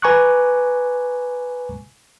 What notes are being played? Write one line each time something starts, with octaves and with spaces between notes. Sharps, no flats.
B4 G#5 A#5 C#6 D6 F#6